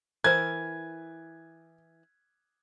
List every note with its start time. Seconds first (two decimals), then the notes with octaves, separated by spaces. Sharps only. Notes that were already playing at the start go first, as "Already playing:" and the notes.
0.24 E3 A#4 C5 G#6